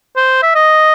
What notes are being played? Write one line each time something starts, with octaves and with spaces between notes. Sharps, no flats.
C5
E5
D#5